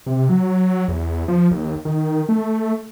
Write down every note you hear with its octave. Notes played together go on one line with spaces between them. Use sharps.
C3
F#3
E2
F3
D#2
D#3
A3